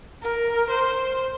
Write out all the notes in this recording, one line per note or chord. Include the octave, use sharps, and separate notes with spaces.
A#4
C5